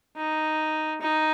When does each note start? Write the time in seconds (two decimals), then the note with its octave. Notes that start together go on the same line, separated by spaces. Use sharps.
0.17 D#4
1.02 D#4